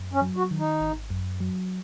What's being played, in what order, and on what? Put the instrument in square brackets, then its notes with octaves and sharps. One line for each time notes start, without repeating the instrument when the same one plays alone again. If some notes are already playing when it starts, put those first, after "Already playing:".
Already playing: [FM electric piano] F#2
[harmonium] C#4
[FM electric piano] F#3
[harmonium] F#4
[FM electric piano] D#3
[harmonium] D#4
[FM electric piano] G#1
F#2
F#3